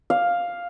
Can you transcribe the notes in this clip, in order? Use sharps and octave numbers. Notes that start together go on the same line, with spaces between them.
F5